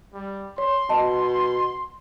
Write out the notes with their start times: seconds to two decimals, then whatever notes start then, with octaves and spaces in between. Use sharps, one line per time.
0.13 G3
0.58 C#5 C6
0.89 B2 D#5 A5